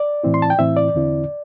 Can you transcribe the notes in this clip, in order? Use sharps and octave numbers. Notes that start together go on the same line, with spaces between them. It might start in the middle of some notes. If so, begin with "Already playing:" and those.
Already playing: D5
A2 E3 C4 E4
C6
A5
G5
A2 E3 C4 E4 E5
D5
E2 D3 C4 E4